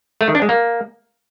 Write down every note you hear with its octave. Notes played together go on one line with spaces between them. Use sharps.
A3
D#3
D4
G#3
A#3